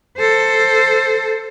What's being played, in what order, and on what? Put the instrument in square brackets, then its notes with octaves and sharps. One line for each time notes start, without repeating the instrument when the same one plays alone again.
[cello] A4 C5